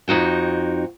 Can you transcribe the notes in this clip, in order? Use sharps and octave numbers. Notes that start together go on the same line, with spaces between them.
F2 D#4 F#4 G5